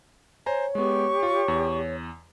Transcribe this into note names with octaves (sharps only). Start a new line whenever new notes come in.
C5 C#5 G#5 A#5
G#3 B3 G4 C#6
F4
E2